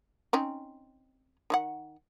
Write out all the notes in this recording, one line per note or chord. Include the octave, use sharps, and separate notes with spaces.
C4 C#4 D#4
D#3 D#4 F#5